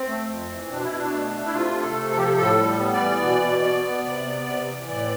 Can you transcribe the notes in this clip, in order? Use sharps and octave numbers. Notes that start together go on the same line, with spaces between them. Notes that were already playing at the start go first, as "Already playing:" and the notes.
Already playing: C4
A3
F2
E3
B2 D4
E4
B2
D4
A3
A3
E4
C3 F4
A3
A4
C3
A4
F3 G4
A4
A2 A4
G3
B3
D5
E3
B2
B2
B3
B3
C3 D5
B3
C3
E3
A2 D5